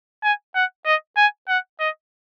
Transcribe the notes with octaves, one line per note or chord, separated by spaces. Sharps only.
G#5
F#5
D#5
G#5
F#5
D#5